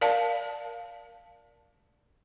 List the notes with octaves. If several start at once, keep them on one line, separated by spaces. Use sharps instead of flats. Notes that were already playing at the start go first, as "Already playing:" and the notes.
A#4 D5 F5 A5